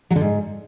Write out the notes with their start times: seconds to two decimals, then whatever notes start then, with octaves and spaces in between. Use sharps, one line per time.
0.10 F#3
0.16 D3
0.21 G#2